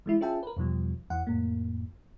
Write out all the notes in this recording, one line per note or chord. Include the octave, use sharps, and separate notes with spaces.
E3 G#3 E4
C#4 F4 G#4 E5 G5 A5
A#4 B4
E2 B2 F3 G3
E2 E3 F#5
F2 A2 A#3